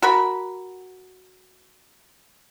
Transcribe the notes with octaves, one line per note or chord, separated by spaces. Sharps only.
F#4 A#4 B5